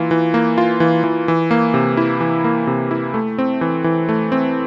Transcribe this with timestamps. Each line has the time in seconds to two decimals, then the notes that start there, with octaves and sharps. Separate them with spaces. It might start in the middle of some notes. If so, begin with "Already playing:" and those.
Already playing: E3 A#3 F4
0.11 E3
0.34 A#3
0.58 F4
0.80 E3
1.04 E3
1.28 E3
1.51 A#3
1.74 C3
1.97 E4
2.20 E3
2.44 A#3
2.67 C3
2.91 E4
3.14 A3
3.38 C4
3.61 E3
3.84 E3
4.09 A3
4.32 C4